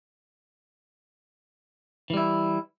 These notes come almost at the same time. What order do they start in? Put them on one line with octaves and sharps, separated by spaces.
E3 G3 E4